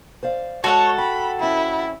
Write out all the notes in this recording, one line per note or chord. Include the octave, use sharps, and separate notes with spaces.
C5 D5 F5
G#3 F#4 A4 C#5 F#5 A5
G5 B5
F2 C#4 E4